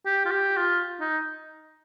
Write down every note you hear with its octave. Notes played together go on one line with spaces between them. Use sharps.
G4
F4
G4
F4
D#4